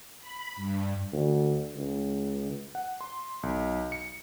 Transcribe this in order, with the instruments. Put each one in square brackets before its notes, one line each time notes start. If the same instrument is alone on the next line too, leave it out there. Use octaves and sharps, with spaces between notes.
[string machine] B5
G2
[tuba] D2
C#2
[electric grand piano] F#5
C6
B1
C#7